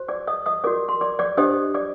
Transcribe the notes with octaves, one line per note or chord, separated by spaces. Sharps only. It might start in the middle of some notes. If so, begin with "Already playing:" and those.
Already playing: F#4 C5
D5 D6
D#5 D#6
D#5 D#6
F#4 A#4 D5 D6
C6
D5 D6
D5 D6
D4 G4 C5 D#5 D#6
D5 D6